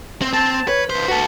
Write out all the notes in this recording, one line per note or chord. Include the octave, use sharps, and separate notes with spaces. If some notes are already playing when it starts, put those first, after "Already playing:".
C4
C4 A5
A5
B4 C#5
C#2 B4 C5
F#4 A4